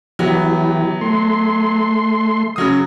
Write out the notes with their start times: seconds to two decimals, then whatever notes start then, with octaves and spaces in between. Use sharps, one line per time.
0.19 E3 F#3 B3 G4
1.01 A3 C6
2.56 C#3 F#3 D#6